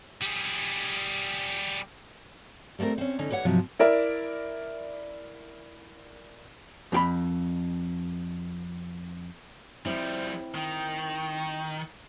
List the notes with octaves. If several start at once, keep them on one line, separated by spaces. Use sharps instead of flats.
G3 G#4
G3 A3 A#3 C4 A#4
C4 C#4
D3 C#4 D#4
E3 G4 C#5 F#5
G#2 C3 F3 F#3
E4 A#4 D5 E5
F2 G4 B5
F3 G3 C4 E4
D#3 G5